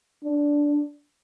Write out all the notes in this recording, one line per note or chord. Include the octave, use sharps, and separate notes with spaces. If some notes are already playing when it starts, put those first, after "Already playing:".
D4